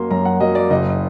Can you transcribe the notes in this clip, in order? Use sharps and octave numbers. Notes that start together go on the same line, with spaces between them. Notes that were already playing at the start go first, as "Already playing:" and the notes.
Already playing: F#2 F#3 A#3 C6
F#2 A#5
F#5
F#3 A#3 D#5
D5
F#1 D#5